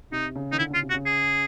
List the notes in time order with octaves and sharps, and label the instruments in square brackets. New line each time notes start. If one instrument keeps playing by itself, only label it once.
[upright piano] C3 [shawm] D#4
[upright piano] C#3
[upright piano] D#3 [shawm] D#4
[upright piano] D3 [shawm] E4
[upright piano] C#3 [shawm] F4
[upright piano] C3
[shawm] F#4
[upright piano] C#3
[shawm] G#4